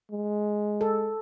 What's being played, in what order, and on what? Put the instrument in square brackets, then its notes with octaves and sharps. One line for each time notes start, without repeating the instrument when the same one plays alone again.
[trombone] G#3
[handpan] A4